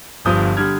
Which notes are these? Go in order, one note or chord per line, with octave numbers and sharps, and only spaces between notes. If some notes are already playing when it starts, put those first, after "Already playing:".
G1 G2 F3 D#6 G6
D3 G3 F6 G#6